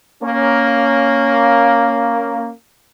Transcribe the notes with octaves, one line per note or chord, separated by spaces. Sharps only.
A#3 C#4